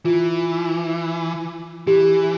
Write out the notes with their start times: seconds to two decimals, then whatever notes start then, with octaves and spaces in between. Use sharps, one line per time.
0.05 E3 F4
1.87 E3 G4